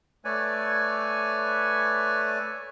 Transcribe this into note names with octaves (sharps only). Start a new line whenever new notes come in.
A3 B4 C#5 D5 G#5